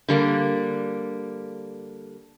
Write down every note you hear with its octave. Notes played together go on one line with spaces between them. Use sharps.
D3 G3 A#3